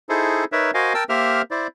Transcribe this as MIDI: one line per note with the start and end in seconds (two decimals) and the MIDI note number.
0.09 0.45 63
0.09 0.45 64
0.09 0.45 68
0.09 0.45 69
0.09 0.45 72
0.52 0.71 63
0.52 0.71 70
0.52 0.71 71
0.52 0.71 73
0.52 0.71 76
0.74 0.93 66
0.74 0.93 70
0.74 0.93 72
0.74 0.93 75
0.74 0.93 77
0.74 0.93 80
0.94 1.04 70
0.94 1.04 79
0.94 1.04 81
0.94 1.04 88
1.09 1.42 58
1.09 1.42 67
1.09 1.42 70
1.09 1.42 72
1.09 1.42 76
1.09 1.42 89
1.51 1.67 64
1.51 1.67 72
1.51 1.67 74